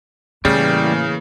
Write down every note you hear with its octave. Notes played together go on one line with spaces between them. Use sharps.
A2 C#3 E3 G3 A3 A#3